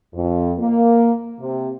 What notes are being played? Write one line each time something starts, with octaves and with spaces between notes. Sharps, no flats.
F2
A#3
C3